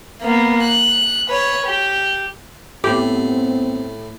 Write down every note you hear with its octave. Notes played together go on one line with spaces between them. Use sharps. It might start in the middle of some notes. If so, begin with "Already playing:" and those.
A#3 B3
F#6
B4 C#5
G4
A2 B3 C4 G4